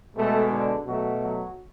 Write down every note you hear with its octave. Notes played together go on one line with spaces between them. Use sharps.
B2 G#3 A3 A4
D3 D4
B2 F#3 A3 F#4
F#3 F#4